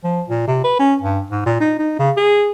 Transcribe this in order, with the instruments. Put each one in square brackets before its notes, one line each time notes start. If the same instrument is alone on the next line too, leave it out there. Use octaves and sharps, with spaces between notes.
[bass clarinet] F3
A#2
C3
B4
C#4
G2
G#2
A#2
D#4
D#4
C#3
G#4